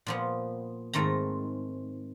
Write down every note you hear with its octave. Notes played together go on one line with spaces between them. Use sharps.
A#2 F3 B3
G#2 D#3 A3 C4 A#5